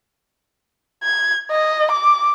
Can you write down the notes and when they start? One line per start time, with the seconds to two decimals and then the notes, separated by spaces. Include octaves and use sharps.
1.03 G#6
1.51 D#5
1.91 D6